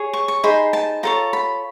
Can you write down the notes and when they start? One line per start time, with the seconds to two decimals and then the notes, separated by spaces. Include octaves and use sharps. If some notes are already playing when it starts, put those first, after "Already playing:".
Already playing: G#4 C#5
0.13 C#6
0.28 C#6
0.43 D#4 G#4 C5 B5
0.73 A5
1.03 F4 A4 C#5 A#5
1.33 B5